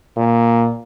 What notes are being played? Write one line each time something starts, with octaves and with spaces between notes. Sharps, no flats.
A#2